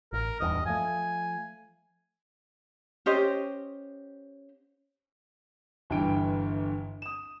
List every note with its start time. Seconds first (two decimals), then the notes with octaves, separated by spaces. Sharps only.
0.13 A1 A#4
0.40 D1 E2 G2 D#5
0.66 F3 A3 G#5
3.06 C#4 G4 C5 D#5
5.90 G1 G2 D3 E3 G5 D7
7.02 D#6 E7